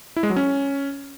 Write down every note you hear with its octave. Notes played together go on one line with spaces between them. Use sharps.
E4
G#3
F#3
C#4